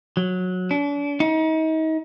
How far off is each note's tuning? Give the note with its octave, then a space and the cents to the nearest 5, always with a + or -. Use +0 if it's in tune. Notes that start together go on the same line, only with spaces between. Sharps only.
F#3 -15
D4 -40
D#4 +35